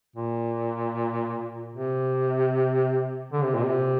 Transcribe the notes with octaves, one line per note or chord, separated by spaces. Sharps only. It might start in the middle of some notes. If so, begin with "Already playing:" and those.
A#2
C3
D3
C3
A#2
C3